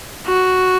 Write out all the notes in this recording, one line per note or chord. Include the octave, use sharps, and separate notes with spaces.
F#4